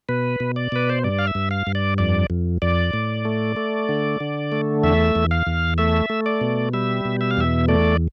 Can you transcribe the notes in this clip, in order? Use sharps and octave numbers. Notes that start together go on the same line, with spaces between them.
B2 B4
B2
D5
B2 B4
C5
G2 D5
F5
E5
G2
F5
G2
D5
F2 D5
F2
F2 D5
A2
A3
A3
D3
D3
A3
E2 E5
E2
F5
E2
A3 E5
A3
D5
B2
G3 E5
B2
E5
F5
E2 E5
A3 D5